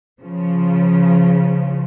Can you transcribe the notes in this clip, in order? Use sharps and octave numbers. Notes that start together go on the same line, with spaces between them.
C#3 F3